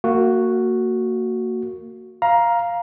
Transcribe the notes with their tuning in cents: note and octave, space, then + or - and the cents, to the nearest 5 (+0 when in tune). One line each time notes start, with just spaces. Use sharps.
A#3 -25 F#4 +0
F5 +0 A#5 +15